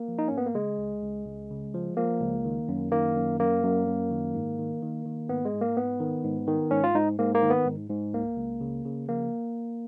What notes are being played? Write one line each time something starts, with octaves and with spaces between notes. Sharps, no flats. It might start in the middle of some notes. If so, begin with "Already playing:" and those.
Already playing: A#3
F3
D#4
G#2 C#4
B3
A#3
C#3 G#3
C#2
C#2
C#2
C#3
F3
F3 A#3
C#2
D#3
F#2
D#3 A#3
F#2
F#2 A#3
F#2
F#2
D#3
G#2
D#3
D#3
D#3
G#2 B3
G#3
G#2
A#3
G#2 B3
D#3
G#2
D#3
G#2 C#4
F4
G#2 D#4
G#2 A#3
A#3
D#3
B3
G#2
G#2
C#2 A#3
C#2
C#3
C#3
F3 A#3